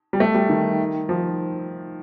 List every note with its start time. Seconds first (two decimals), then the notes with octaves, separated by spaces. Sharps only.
0.13 G3
0.20 A3
0.34 G3
0.49 D#3
1.09 F3